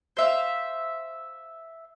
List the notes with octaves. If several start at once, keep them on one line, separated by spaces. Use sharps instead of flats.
C5 E5 F5